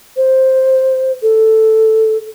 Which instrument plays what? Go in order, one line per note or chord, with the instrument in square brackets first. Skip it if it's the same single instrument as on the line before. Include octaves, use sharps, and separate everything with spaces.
[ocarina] C5
A4